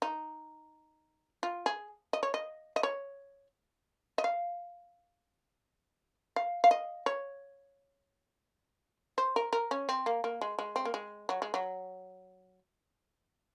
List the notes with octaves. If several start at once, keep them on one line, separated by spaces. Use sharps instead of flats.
D#4
F4
G#4
D#5
C#5
D#5
D#5
C#5
D#5
F5
F5
F5
D#5
C#5
C5
A#4
A#4
C#4
C4
A#3
A#3
G#3
G#3
C4
A#3
G#3
F#3
G#3
F#3